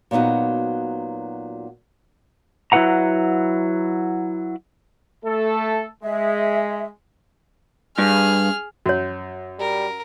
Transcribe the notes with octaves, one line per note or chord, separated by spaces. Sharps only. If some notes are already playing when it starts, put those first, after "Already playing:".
A#2 F#3 B3 D#4 F#4
F#3 E4 F#4 B4 F#5 A#5
A3 A4
G#3 E5
G2 G#4 F6
F#2 F#4 C#5
G3 A#4